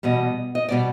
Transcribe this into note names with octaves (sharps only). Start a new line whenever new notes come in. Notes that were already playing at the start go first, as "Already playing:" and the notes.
E2 B2 G3 D#5
D#5
B2 G3 D5